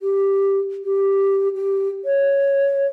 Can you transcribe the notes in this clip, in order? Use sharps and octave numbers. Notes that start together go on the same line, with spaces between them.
G4
G4
G4
C#5